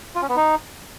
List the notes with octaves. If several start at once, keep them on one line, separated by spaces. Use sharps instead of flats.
F4
C#4
B3
D#4